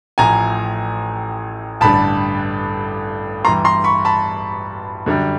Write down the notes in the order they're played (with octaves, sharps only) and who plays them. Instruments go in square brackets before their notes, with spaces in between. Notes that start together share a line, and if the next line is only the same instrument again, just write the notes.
[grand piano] A1 A2 F3 G#5 A#5
A1 G2 D3 A5 B5
G2 E3 G3 A#5 C6
A#5 C6
B5 C#6
A5 B5
F#2 D3 G3